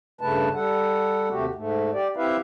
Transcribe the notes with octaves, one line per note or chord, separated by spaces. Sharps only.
G2 C#3 A3 B4 A5
G3 A4 F#5
D#2 C3 A3 F#4 G4
G#2 A3
G4 D5
C4 E4 G4 B4 E5 F5